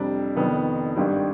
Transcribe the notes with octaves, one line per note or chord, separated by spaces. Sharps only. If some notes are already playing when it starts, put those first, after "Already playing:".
Already playing: F2 C3 G3 D4
F1 F2 D#3 B3
G#1 G2 D#3 G3